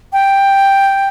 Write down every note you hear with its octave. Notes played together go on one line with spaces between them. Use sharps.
G5